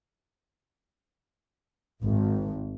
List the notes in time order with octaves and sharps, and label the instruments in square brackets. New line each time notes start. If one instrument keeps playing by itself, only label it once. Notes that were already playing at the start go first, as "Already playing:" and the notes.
[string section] G#1